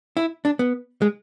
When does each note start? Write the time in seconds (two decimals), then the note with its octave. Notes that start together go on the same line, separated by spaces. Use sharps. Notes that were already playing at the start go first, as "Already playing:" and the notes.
0.17 E4
0.45 D4
0.59 B3
1.02 G#3